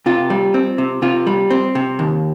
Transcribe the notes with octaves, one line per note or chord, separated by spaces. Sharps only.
C3 F4
G3
C4
C3
C3 F4
G3
C4
C3
D#2